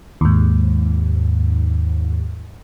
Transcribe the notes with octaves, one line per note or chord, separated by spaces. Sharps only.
D#2 G#2